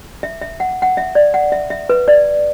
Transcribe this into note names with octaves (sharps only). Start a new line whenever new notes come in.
E5
E5
F#5
F#5
E5
D5
F#5
E5
E5
B4
D5